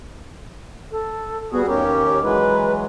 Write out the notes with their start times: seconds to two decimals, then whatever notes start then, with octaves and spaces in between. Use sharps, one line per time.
0.91 A4
1.52 G3 B3 F#4 G#4
1.67 D#2 C#4 G4 A#4
2.22 E3 F#3 G#3 B4